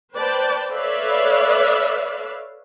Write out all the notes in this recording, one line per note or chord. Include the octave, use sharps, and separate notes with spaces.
B4 C5 D5 G5 A5
A4 B4 C#5 D5 E5 F5